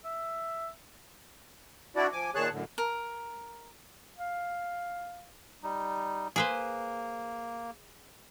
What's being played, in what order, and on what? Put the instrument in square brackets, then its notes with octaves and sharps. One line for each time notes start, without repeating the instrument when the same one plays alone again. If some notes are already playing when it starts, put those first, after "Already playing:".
[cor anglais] E5
[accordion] D4 E4 F#4 D5
F3 G#5 D6
A#2 D#3 G#4 C#5 A5 F#6
F#2 A2 D3
[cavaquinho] A#4
[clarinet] F5
[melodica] G3 D#4
[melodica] A#3 [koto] G#4 B4 C5